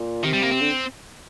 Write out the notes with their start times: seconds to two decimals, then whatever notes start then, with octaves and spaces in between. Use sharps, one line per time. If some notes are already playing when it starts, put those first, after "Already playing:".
Already playing: A#2
0.24 C3 D#3
0.33 G3
0.42 A#3
0.52 C4
0.61 D3